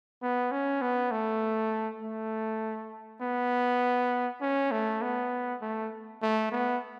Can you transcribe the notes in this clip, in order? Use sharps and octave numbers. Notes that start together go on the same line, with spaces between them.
B3
C#4
B3
A3
A3
B3
C#4
A3
B3
A3
A3
B3